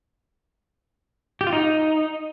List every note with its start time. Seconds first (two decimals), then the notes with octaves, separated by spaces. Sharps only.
1.41 G4
1.47 F4
1.53 D#4